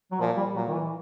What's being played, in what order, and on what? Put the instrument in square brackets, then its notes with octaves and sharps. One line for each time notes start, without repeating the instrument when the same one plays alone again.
[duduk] F#3
[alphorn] A#2 [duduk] F3
[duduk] G3
[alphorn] A#2 [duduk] F#3
[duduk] D#3
E3